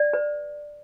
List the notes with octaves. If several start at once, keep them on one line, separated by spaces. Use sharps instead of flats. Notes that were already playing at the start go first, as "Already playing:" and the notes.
Already playing: D5
B4